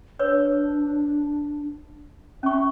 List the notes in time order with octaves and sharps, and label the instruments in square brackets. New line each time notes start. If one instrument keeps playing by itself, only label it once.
[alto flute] D4 [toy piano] B4 C#5 E6
[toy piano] C#4 C#6 [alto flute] E5